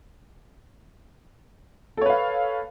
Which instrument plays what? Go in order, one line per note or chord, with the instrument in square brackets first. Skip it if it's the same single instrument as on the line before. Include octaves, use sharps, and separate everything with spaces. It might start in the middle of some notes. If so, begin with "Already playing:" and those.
[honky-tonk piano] A4
C#5
B4
F5